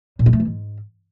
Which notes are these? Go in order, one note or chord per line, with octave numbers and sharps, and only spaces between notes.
A#2
G#3
A3
E3
G#2